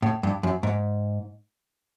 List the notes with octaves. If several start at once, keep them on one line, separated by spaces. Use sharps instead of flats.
A2
G2
F#2
G#2